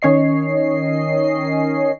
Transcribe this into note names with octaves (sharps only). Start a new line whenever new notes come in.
D#3 C#4 C#5 D#5 C7